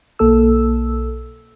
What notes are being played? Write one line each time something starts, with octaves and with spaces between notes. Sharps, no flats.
B1 A#3 A4 E6